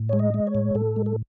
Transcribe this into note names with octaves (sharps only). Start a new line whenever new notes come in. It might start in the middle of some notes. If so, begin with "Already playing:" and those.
Already playing: A2
G#3 C#5
D#5
G#3
C#5
A2
A2 A4
G#3
A4